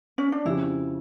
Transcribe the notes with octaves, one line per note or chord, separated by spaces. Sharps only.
C#4
D4
F2 C#3 F3 C#4 E4 G4